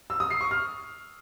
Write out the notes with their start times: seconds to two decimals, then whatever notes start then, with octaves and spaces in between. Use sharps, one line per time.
0.10 E6
0.20 D#6
0.30 C7
0.41 C#6
0.51 F6